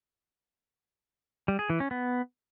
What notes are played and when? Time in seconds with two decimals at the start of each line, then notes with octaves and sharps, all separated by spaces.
1.48 G3
1.59 G#4
1.70 E3
1.80 C#4
1.91 B3